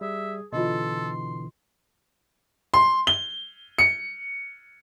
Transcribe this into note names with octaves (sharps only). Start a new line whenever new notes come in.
G3 G#4 E5
B2 D3 E3 F4 A4 D#5 C6
C6
G7
C#7